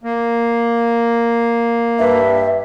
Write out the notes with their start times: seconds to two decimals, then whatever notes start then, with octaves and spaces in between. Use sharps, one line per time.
0.04 A#3
1.99 G2 E5